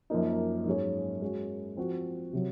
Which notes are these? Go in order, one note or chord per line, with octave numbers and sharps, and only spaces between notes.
F#2 F3 A#3 D#4
G#2 F#3 C#4 G#4 C#5
G#3 C#4 F#4
F3 C4 F#4
C3 F#3